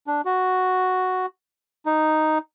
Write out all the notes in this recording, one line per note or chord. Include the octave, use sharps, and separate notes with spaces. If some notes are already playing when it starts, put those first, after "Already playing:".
D4
F#4
D#4